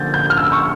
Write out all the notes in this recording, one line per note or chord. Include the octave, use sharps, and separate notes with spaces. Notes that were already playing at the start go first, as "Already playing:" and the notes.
Already playing: D3 F3 A#3 G6 A6
G6
F6
E6
C#6